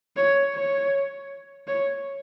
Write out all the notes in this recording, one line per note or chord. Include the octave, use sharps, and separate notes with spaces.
C#5
C#5
C#5